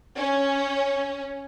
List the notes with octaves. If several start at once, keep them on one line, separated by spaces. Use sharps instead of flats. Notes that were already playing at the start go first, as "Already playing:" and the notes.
C#4